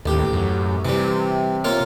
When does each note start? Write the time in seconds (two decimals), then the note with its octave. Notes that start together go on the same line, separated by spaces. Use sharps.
0.06 A1 D#2 G4
0.33 F#2
0.85 C3 E3 G3
1.64 A#3 F4 C#5